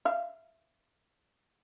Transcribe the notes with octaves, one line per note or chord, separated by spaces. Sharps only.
E5 F5